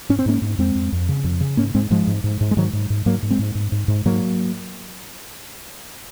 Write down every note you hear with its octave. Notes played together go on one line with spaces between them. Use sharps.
G#2 C#4
C4
G#2 A#3 C#4
G#2
F2 G#3 C4
F2
F2
C#3
F2
C#3
G#2 A#3 C#4
G#2 G#3 C4
G#2 F3 G#3
G#2
G#2
G#2
G#3
G#2 D#3 F#3
G#2
G#2
G#2 F#3 A#3
G#2
G#3 C4
G#2
G#2
G#2
G#2
G#2 F#3 A#3